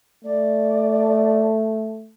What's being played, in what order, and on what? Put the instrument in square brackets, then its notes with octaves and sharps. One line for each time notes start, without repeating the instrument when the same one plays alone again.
[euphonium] A3 [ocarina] D5